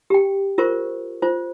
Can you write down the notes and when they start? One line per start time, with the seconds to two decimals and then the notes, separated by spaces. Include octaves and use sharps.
0.10 G4 G5
0.58 F4 A#4 C5 C#6
1.22 F4 C5